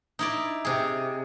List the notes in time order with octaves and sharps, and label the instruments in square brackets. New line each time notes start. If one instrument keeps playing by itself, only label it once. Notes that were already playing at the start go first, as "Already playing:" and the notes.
[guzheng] D#4 E4 D5
C3 G#4